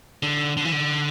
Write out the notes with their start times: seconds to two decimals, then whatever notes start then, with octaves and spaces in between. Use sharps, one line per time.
0.23 D3
0.57 D3
0.65 E3
0.72 D3